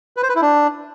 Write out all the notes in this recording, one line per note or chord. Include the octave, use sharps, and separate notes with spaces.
B4
C5
B4
E4
D4